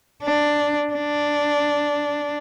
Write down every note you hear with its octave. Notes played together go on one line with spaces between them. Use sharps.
D4
D4